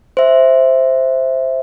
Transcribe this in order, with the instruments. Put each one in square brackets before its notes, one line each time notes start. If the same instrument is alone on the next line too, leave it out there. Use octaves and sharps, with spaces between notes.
[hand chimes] C5 E5